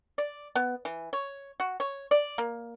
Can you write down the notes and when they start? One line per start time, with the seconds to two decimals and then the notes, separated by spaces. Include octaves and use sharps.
0.18 D5
0.55 B3
0.85 E3
1.13 C#5
1.60 F#4
1.80 C#5
2.11 D5
2.38 A#3